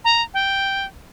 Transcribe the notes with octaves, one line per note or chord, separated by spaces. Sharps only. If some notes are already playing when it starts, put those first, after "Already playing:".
A#5
G5